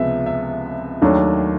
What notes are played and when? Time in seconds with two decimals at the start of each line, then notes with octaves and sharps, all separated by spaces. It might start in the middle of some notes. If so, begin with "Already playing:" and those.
Already playing: C#2 C3 F3 G#3 B3 E5
0.26 E5
1.02 D#2 D#3 F#3 A3 D4